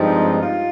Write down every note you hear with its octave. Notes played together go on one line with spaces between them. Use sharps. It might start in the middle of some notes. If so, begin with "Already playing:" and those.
Already playing: G2 F3 G#3 C4 D#4
F4